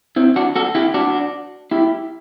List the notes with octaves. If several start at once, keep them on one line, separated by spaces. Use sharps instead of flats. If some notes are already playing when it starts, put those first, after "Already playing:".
C4 E4
D4 F#4
F#4 A4
E4 G4
D4 F#4
E4 G4